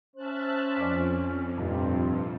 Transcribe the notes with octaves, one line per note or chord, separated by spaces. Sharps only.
C#4 C5 E5 A5 F#6
F2 D5 D6 B6
F1 G2 A#2 C4